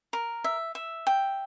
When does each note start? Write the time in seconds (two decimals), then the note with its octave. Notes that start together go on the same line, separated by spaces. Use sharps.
0.13 A#4
0.44 E5
0.75 E5
1.07 G5